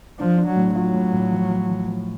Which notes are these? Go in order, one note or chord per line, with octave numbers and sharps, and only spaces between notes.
F3 D4
D4
F#3
A2
F#3 F4
A2
A2
F3
F3
F3
F3